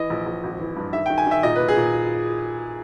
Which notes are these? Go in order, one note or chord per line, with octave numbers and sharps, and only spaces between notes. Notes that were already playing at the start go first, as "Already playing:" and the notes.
Already playing: E3 D#5
A#1
A#1
G#1
E3
G2
D#3 E5
D#3 G5
G#5
D#3 E5
A#2 D#5
A#2 B4
G#4
A#2